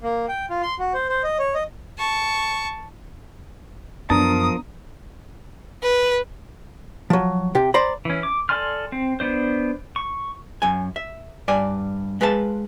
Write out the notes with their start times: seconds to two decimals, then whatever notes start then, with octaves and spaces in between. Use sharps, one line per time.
0.03 A#3
0.28 G5
0.50 F4
0.62 C6
0.79 F#4
0.94 C5
1.09 C5
1.23 D#5
1.39 C#5
1.55 D#5
1.98 A5 C#6
4.10 F#2 F3 B3 D4 A#4 A5 A#5 D#6
5.82 B4
7.10 F3 F#3
7.55 C3 G4
7.74 C5 D5 A#5 B5
8.05 E3 C#4
8.23 D6
8.49 A4 D5 G#5 C6 F6
8.92 C4
9.20 B3 D4 C5
9.96 C#6
10.62 F#2 G#5
10.96 E5
11.48 G2 D5 G#5
12.21 G#3 B4 F5 A5